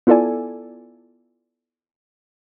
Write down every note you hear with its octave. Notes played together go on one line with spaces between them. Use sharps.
B3 E4 F4 A4 D5 G#5